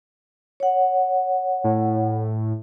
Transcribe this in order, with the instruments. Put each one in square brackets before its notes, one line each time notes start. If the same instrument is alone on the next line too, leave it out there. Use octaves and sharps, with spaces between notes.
[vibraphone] C#5 F#5
[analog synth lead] A2